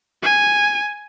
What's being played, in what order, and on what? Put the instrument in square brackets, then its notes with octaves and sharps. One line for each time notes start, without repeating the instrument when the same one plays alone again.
[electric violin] G#5